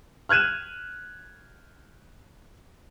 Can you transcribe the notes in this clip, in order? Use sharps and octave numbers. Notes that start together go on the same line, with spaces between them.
F6 F#6 G#6 D#7 E7